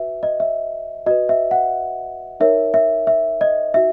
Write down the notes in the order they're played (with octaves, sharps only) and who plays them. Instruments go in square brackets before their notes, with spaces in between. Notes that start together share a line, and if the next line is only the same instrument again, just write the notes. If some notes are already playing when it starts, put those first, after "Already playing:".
Already playing: [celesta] F#4 B4 E5
D#5
E5
F#4 D#5
B4
E5
F#5
D#4 A#4 C#5 E5
E5
E5
D#5
D#4 F#4 E5